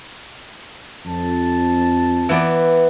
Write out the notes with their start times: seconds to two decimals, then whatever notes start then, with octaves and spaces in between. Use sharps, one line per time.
1.06 F2 A5
2.29 E3 B3 D5